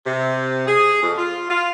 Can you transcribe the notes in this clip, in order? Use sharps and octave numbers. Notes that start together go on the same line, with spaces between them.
C3
G#4
F2
F4
F4